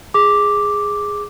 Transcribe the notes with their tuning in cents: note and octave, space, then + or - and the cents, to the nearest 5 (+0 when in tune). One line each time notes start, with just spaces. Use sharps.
G#4 -5 D6 +0